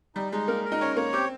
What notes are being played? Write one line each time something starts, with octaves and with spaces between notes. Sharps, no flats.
G3 D#4
G#3 D#4
A#3 A#4
A#4
D#4
C#4 C#5
A#3 C#5
C4 G4